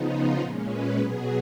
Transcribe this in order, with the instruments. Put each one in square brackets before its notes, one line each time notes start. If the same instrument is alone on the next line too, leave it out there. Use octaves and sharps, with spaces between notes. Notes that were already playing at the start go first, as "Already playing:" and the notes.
Already playing: [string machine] C#3 F3 B3 D#4
F4
A#2 G#3 C#4
B4
B2 F#3 B3 G#4